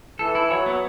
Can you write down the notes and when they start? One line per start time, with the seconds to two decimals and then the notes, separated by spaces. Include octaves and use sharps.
0.19 E3 A4
0.35 E4
0.50 F#3 C#5
0.66 B3